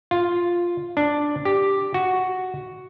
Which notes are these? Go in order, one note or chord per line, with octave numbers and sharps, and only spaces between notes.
F4
D4
G4
F#4